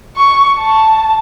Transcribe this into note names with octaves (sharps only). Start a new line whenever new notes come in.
C#6
A5